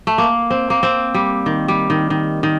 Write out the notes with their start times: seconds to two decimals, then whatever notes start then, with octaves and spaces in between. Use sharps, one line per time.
0.07 A3
0.18 A#3
0.50 C4
0.70 A#3
0.83 C4
1.14 G3
1.46 D#3
1.68 G3
1.90 D#3
2.10 D#3
2.43 D#3